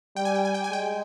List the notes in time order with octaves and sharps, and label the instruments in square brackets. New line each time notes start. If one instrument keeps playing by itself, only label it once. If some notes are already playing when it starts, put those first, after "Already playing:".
[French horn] G3 [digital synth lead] G5
[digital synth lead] G#5
G5
G#5
G5
G#5
[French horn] G#3 [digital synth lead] G5